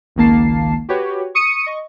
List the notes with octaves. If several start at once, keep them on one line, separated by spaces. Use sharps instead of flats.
G#1 C#2 D#3 A#3 A5 C7
F#4 G4 B4 C#5
C#6 D#6 C#7 D#7
D#5 C#6